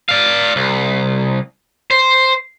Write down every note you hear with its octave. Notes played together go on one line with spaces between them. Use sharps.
D5 F5
C2
C5